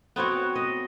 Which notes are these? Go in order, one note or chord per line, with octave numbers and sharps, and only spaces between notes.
B3 C4 F#4 C#5
D#5